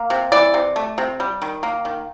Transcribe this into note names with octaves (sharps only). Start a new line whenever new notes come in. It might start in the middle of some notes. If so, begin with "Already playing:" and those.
Already playing: A#3
C3
E3 D5
C3
A3
C3
G3
D#3
A#3
D#3